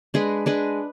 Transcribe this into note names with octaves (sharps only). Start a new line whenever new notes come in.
G#3 D4 G#4 B4
G#3 D4 G#4 B4